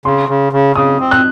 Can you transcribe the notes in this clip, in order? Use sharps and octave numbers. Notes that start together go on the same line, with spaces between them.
C#3 C6
C#3
C#3
C#3 D#6
C4
F#6